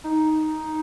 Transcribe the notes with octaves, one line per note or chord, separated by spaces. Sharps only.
D#4